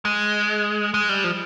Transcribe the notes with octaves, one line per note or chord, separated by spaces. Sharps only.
G#3
G#3
G3
F3